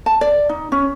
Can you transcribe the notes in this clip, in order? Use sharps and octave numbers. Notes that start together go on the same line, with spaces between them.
A5
D5
D#4
C#4